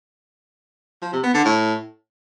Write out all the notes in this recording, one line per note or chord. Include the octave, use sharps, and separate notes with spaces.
F3
C3
B3
D3
A2